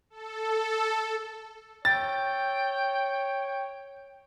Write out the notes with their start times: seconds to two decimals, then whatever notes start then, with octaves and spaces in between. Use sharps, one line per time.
0.10 A4
1.85 C#5 G5 A6